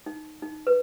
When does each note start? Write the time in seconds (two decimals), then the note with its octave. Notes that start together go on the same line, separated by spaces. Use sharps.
0.06 D#4
0.42 D#4
0.67 B4